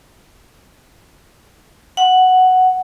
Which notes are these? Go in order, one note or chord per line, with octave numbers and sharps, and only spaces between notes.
F#5